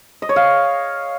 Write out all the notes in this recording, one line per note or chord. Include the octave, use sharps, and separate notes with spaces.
D#5
C#5
F5